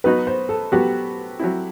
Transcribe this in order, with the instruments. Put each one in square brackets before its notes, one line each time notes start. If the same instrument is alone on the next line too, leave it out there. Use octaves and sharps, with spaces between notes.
[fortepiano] F#3 B3 D#4 F#4 [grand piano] B4
[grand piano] C5
A4
[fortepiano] F#3 B3 F#4 [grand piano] G4
[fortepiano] F#3 C4 E4